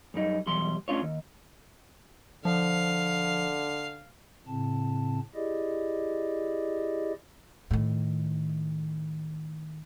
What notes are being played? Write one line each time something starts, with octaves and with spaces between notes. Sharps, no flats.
F#2 G3 D#4
B1 E2 G3 C6
A3 C#4 D4 F4 C#5
D#2
D3 F3 F5
A2 C#3 C4 A5
E4 G4 G#4 D5 D#5
A2 D#3